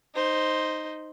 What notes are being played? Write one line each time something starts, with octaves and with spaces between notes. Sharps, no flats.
D#4 C5